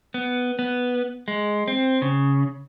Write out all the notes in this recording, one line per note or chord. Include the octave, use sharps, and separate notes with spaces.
B3
B3
G#3
C4
C#3